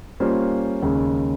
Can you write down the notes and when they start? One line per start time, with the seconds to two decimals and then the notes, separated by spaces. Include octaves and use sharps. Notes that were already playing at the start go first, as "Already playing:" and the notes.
0.20 G3 A#3 C#4 F4 C5
0.82 D#2 C#3 G#3 C#4